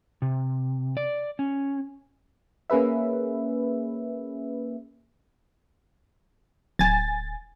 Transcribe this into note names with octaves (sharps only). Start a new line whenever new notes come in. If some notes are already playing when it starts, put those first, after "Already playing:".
C3
D5
C#4
A#3 C#4 G#4 B4 E5
D1 G#5 A6